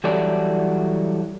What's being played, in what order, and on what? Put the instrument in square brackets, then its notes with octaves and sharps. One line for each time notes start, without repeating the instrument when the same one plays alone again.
[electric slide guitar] E3 F#3 G3 F#4 A4 D5